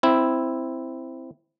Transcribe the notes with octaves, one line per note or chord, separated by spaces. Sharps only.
C4 E4